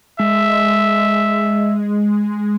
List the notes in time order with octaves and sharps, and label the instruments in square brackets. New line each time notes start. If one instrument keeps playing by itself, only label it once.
[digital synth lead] G#3 [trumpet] E5